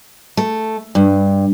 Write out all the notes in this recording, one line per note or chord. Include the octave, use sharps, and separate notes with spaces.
A3
G2